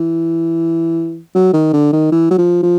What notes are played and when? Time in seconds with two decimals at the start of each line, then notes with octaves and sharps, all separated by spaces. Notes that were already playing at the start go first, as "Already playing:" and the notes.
Already playing: E3
1.35 F#3
1.53 D#3
1.73 D3
1.92 D#3
2.12 E3
2.31 F#3
2.38 F3
2.63 F3